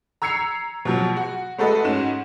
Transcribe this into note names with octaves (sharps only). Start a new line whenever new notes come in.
A#5 E6 G#6 C7 C#7 F7
B2 F3 F#3
F#4
G#3 A3 F#4 A4 B4 D#5
G#2 C#4 F#4 E7